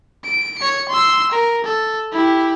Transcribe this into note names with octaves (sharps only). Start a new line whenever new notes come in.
D7
C#5 C#7
C6 E6
A#4
A4
E4 G4